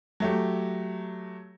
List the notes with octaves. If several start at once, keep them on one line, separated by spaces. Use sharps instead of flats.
F#3 A3 G4